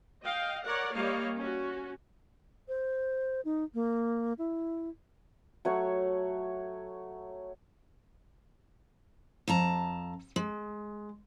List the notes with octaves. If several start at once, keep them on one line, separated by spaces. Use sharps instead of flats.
D#5 F5 G5
A#4 C#5 D5 F#5
G3 A#3 C#5 D#5 F5
C#4 F#4
C5
D#4
A#3
E4
F#3 A3 C#5 F#5
F2 A5 A#5
G#3